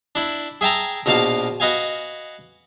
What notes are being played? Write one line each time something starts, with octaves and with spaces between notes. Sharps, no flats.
D4 E4
G#4 E5 G5 A5 A#5
A#1 B2 A#3 F5 A5
F#4 B4 D#5 F5 G#5